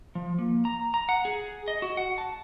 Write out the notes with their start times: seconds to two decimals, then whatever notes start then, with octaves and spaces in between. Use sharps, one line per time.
0.15 F3
0.39 A#3
0.65 A#5
0.94 A#5
1.09 F#5
1.25 G#4
1.68 D#5
1.82 F#4
1.97 F#5
2.18 A5